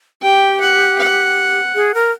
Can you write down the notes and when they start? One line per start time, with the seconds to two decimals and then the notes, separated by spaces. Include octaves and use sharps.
0.22 G4 G5
0.60 F#5
0.98 F#5
1.75 G#4
1.94 A#4